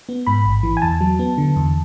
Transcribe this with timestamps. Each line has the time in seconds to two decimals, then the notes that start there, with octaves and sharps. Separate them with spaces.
0.09 B3
0.27 G#2 B5
0.45 A1
0.63 E3
0.77 G#5
0.82 E2 A5
1.01 F#3
1.19 B3
1.38 D3
1.56 E2